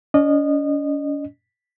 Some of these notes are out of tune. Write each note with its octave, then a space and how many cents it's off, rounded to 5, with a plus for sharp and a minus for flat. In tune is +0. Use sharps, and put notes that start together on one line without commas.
C#4 +45 D#5 -25